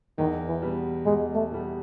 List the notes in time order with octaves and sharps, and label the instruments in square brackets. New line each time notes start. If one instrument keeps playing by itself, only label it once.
[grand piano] E2 [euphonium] D#3
[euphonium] E3
[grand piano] B2 G3
[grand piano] E2 [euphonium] G#3
[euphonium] A3
[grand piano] B2 G3